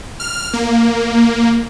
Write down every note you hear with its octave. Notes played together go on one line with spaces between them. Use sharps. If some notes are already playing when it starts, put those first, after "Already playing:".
F6
A#3